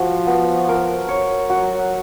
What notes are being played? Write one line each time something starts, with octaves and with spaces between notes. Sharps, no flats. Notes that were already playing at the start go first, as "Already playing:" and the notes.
Already playing: F3 F#4
B3
A#4
C#5
F#3 F#4